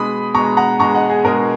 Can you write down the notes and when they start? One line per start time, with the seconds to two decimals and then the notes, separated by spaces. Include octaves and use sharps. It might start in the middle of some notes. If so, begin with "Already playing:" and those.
Already playing: B2 G#3 B5 D#6
0.34 B2 A#5 C#6
0.38 G#3
0.57 F#5 A#5
0.80 B2 G#3 A#5 C#6
0.95 D#5 F#5
1.10 G#4
1.25 B2 G#3 A#4